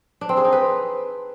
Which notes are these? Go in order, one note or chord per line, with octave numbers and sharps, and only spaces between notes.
D4
C4
G#4
D#4
B4